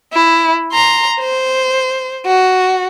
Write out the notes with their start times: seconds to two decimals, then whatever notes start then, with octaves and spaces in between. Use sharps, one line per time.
0.13 E4
0.72 A#5 C6
1.19 C5
2.26 F#4